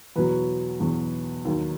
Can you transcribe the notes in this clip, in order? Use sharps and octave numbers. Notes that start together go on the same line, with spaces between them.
E2 B2 F#3 B4
E2 B2 F#3
D#2 D#3 F#3